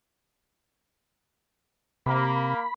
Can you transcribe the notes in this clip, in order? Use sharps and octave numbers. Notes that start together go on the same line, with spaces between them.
C3 A#3 B5